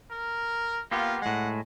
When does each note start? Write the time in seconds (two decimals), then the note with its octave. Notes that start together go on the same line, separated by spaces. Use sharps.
0.11 A#4
0.91 A#3 B3 F4 G4
1.22 A2 G#3 F#5